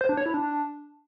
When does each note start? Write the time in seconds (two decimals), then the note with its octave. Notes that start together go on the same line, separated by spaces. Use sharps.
0.01 C5
0.09 D4
0.17 C#5
0.26 E4
0.34 D4